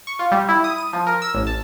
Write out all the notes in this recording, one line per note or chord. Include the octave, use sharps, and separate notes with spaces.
C#6
F4
G3
E4
D#6
D#7
F3
A#4
E6
A1
A5